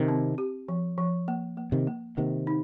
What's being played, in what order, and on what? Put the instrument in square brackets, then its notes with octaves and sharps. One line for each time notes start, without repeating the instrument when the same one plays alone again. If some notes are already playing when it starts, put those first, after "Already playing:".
Already playing: [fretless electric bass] C3 D#3
[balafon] C4
G4
F3
F3
A#3
A#3
[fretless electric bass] C3 D#3
[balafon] A#3
[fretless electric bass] C3 D#3 [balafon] A#3
[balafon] D#4